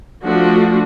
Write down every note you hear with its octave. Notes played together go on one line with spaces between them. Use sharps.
F3 A3 D4 F#4